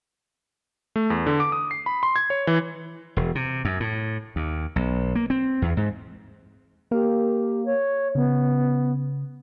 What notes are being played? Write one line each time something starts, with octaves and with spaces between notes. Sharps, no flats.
A3
E2
D3
D6
D#6
C7
B5
C6
G#6
C#5
E3
E1
C3
F#2
A2
D#2
B1
A#3
C4
E2
G#2
A#3 G4 A#4 F5
C#5
C#3 B3